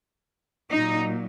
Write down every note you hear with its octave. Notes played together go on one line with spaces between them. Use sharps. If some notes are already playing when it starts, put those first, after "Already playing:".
A#2 F#3 D#4